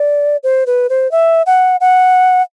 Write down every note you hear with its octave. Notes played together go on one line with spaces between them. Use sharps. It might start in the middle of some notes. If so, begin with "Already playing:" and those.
Already playing: D5
C5
B4
C5
E5
F#5
F#5